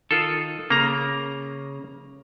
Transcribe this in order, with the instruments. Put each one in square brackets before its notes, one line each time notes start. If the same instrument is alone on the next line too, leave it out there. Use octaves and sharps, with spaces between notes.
[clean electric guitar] D#3 [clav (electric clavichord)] F4 A4
[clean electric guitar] C#3 [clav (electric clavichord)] A#3 A#5